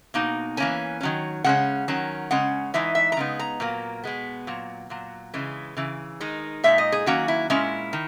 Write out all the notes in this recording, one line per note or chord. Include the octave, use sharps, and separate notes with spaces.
B2 A#3 D#4
E3 A#3 C#4 G#5
D#3 F#3 C#4
C#3 G#3 C#4 F#5
D#3 F#3 C#4
C#3 G#3 C#4 F#5
E3 G#3 D#4 E5
E5
A#5
C#3 G#3 B3 D#4
A#5
A#2 F#3 A#3
B2 G#3 B3
A#2 F#3
A#2 F#3
C#3 E3 G#3
C#3 E3
D#3 G#3 D#4
A#2 G#3 D#4 E5
D#5
G#4
D#3 F#3 A#3 C#4 F#4
E4
A#2 G#3 C#4 E4
D#3